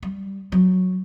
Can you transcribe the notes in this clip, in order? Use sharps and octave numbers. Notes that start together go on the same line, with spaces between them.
G3
F#3